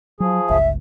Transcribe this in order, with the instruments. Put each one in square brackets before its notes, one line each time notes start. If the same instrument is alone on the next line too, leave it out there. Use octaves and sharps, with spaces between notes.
[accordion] F3 G#4 [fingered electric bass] F#3
[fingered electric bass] G1 C#2 [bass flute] E5